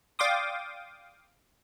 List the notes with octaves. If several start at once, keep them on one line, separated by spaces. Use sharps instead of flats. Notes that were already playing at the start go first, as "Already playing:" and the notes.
D5 F5 G5 C6 D6 D#6